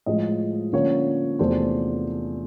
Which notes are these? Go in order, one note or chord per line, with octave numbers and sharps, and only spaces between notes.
A2 F3 G#3 D#5
D3 F3 A#3 C#4 C#5
E2 C3 F3 A3 D4 C5